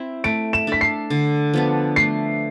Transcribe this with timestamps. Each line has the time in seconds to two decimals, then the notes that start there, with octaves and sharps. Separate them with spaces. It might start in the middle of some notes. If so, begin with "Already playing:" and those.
Already playing: C4 E4
0.24 A3 D7
0.53 E7
0.67 D4 A4 B6
0.81 C7
1.10 D3
1.54 F3 B3 D4
1.96 A3 C7